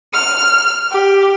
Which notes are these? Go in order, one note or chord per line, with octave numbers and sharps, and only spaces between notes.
F6
G4